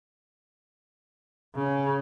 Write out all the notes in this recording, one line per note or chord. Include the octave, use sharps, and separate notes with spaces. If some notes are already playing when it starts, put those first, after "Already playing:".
C#3